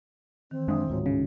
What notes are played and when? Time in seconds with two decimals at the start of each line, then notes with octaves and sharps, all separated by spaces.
0.51 D#3 E3 C4
0.68 F#2 G#3 D4 E5 C6 D#6
0.88 D1 G#2 F4 F#4 C#5
1.06 C#3